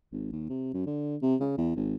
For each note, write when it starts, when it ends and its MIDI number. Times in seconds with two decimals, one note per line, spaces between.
0.12 0.31 32
0.33 0.47 39
0.49 0.73 48
0.74 0.85 42
0.86 1.16 50
1.22 1.36 48
1.41 1.55 49
1.58 1.73 40
1.76 1.96 32